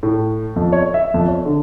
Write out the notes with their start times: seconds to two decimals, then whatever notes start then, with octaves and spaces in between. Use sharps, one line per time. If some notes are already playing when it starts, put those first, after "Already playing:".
0.03 A2
0.56 F2
0.73 C#5
0.94 E5
1.14 F2
1.28 C#5
1.45 D3